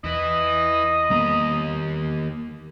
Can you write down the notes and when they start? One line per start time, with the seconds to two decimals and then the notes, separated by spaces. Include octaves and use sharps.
0.04 E2 E4 B4 D#5
1.10 D#2 G3 A#3 B3 A#5